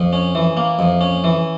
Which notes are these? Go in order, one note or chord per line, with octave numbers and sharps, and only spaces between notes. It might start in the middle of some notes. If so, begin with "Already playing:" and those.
Already playing: F2
C#4
E3
A#3
F2
C#4
E3